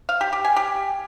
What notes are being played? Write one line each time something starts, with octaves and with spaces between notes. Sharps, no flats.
F5
G4
G4
G#5
G4